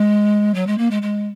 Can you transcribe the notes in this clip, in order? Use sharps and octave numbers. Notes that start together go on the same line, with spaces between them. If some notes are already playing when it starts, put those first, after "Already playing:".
Already playing: G#3
F#3
G#3
A#3
G#3
G#3